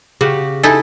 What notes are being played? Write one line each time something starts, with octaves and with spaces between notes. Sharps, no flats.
C#3 F#4 G4
D#4 E4 A4 G#5